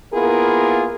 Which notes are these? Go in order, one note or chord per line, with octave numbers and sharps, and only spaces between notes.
A#3 B3 E4 F4 G#4 A#4